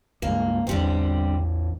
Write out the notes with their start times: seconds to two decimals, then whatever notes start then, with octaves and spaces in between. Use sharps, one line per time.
0.22 C#2 G2 G#3 A#3
0.67 A1 E2 D3 G3 C4